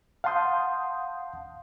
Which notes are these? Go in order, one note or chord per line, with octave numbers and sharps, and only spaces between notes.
F5 F#5 A5 C6 D#6 G6